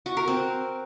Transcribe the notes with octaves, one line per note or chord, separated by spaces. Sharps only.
F#4
A#4
C4